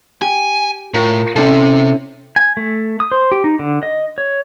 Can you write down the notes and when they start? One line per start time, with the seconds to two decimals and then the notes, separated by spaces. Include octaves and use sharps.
0.22 G4 G#5
0.94 A2 F4 A#4
1.36 C3 C#4 E4 A4
2.36 G#5
2.57 A3
3.00 D#6
3.12 C5
3.32 G4
3.44 D#4
3.59 D3
3.83 D#5
4.18 C#5